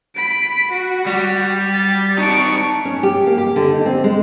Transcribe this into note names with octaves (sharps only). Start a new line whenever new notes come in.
B5 D7
F#4
G3
A6
D#4 A5 C#6 D7
C#4
G4
A#3
G4
D3
D#4
C4
G#3